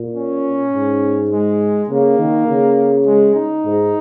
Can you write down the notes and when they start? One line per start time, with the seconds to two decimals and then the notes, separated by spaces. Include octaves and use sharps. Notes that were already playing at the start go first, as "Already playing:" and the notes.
Already playing: A#2
0.15 C#4
0.73 G#2
1.31 G#3
1.89 C#3 A#3
2.18 D#3
2.47 C#3
3.06 G#3
3.35 D#4
3.65 G#2